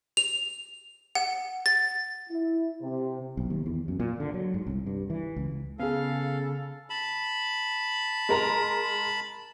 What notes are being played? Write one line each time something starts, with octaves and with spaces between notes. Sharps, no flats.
F7
F#5
A6
E4
C3
B1
D#2
E2
F#2
A#2
D3
F#3
G#2
C2
G2
E3
C#2
C#3 B3 G#4 A4 F5
A5 B5
G#3 A#4 A#5